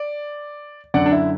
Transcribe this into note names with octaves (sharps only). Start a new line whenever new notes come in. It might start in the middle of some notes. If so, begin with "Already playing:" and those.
Already playing: D5
F#2 D3 D5 F#5
D4
E4